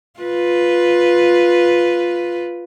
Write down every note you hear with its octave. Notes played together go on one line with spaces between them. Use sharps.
F4 B4